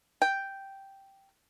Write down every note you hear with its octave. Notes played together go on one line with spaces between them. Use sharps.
G5